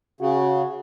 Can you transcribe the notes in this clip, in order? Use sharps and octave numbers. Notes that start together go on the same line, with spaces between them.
C#3 F#4